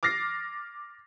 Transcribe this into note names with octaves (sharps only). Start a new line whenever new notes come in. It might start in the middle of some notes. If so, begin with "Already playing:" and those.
D6 F6 A6 A#6 C7